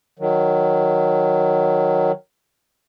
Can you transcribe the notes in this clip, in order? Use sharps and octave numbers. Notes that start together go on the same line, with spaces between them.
D#3 F#3